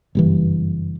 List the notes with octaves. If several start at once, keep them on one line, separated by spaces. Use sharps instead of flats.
F#1 G2 E3